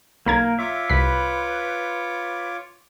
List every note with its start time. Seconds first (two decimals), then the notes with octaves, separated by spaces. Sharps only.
0.26 B1 A#3 A#4 A#5 G#6
0.59 F4 C#5 E5 D6
0.89 C2 B4 B6